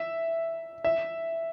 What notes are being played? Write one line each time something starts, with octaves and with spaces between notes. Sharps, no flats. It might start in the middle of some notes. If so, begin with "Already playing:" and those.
Already playing: E5
E5